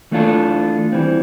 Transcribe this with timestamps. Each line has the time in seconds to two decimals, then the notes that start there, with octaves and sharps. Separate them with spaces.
0.11 E3 A3 D4 F4 A4
0.92 E3 G3 C4